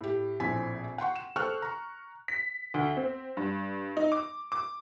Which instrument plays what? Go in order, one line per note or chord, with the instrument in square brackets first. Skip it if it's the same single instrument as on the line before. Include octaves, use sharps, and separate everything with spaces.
[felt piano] A2 G4
A#1 A2 C4 G#5 B6
F#5 G5 C6 C#6
E7
A4 C5 G5 C#6 F6 F#6
A#5 C#6
[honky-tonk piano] B6
D2
C4
G2
D#4
D6
D6